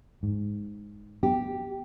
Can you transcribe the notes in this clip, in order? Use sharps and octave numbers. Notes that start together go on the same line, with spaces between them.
G#2
B3 G4